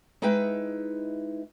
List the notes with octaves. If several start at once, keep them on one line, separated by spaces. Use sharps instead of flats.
G#3 D#4 E4 B4 E5 G5